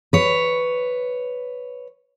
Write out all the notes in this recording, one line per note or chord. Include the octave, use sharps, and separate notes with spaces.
B4 C#5